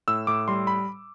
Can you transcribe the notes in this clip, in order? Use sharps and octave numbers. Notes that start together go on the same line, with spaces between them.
A2 E6
A2 D6
G3 C6
B5